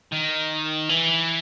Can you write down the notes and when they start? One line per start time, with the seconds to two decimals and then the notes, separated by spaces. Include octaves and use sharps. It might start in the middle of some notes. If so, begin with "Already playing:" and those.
0.12 D#3
0.89 E3